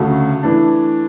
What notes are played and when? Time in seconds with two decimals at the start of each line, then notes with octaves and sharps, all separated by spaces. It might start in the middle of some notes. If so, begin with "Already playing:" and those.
Already playing: D2 C#3 F#3 A3
0.43 E3 A3 D4